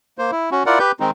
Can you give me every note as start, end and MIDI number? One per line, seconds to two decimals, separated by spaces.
0.18 0.31 58
0.18 0.31 72
0.32 0.50 64
0.52 0.63 61
0.52 0.63 66
0.66 0.79 64
0.66 0.79 65
0.66 0.79 70
0.66 0.79 74
0.66 0.79 78
0.79 0.92 67
0.79 0.92 71
0.79 0.92 91
1.00 1.11 51
1.00 1.11 56
1.00 1.11 60
1.00 1.11 63